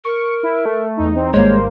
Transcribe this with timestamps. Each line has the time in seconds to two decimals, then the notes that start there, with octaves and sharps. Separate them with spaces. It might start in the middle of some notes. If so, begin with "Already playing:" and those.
0.05 A#4 C#6
0.43 E4
0.65 A3
0.97 E2 D#4
1.16 C4
1.34 G#1 G2 G#3 A#3 C5 C#5